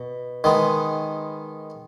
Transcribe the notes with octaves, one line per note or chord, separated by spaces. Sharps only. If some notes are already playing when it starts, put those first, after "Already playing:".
Already playing: B2
D#3 G#3 B3